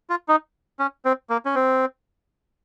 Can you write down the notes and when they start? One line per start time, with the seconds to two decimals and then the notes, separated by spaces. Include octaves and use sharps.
0.10 F4
0.28 D#4
0.79 C#4
1.05 C4
1.30 A#3
1.45 C#4
1.55 C4